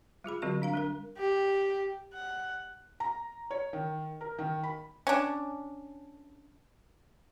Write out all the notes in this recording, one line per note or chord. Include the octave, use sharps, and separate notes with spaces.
G3 F4 G#4 B5
D3 F#3 G3 C4 F#4 C#6
D4 F5 A#5
G3 D4 A#4
G4
F#5
A#5
C#5
D#3
A#4
D#3
B5
C#4 D4